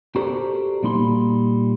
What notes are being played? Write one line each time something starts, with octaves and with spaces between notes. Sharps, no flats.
F#4 G4 A4 A#4 C5 D5
A#2 G3 A#3 D#4 B5 C6